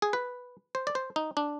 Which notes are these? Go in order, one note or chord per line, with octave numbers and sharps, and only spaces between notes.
G#4
B4
C5
D5
C5
D#4
D4